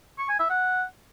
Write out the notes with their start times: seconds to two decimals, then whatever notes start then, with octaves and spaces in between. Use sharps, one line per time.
0.19 C#6
0.29 G#5
0.39 E5
0.50 F#5